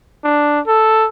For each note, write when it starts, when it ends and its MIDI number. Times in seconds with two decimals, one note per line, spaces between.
0.24 0.60 62
0.67 1.06 69